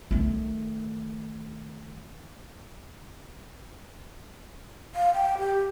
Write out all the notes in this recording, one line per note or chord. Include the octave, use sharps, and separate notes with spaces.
D#3 A3
F5
G5
G4